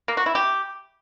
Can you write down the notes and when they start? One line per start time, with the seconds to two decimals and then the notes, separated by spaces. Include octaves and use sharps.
0.08 A#3
0.17 F#4
0.26 E4
0.35 G4